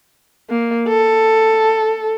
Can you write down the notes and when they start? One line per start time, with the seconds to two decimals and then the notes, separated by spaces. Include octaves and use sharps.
0.49 A#3
0.88 A4